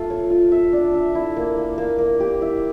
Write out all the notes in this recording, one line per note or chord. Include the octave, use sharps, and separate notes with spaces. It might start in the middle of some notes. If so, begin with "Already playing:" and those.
Already playing: A3 F4
C#5
F4
E5
D4
E5
E4
A#3
A#3
A#3
A#3
G4
E4